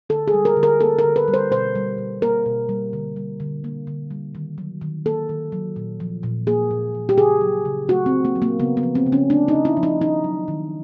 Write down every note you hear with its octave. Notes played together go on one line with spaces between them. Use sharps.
D3 A4
G#4
G3
A#4
D3
A#4
A#3 A4
A#4
D3
B4
G3
C5
B2 C5
G3
B2
A#3 A#4
B2
G3
D3
G3
D3
A#3
D3
G3
D#3
F#3
D#3
A#3 A4
D#3
F#3
A#2
F3
A#2
A#3 G#4
A#2
F3
G4
C#3 G#4
F#3
C#3
A3 F#4
C4
C#3
A#3
F#3
A#3
C#3 B3
B3
F3
C4
C#3
C#4
A3 D4
D#4
C#3
E4
F3
D#4
D#3 D#4
F#3
D#3